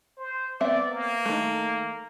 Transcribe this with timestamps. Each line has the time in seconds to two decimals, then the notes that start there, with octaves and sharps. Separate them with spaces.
0.18 C5
0.61 B3 C4 D5 E5
0.92 A#3
1.25 D#3 A3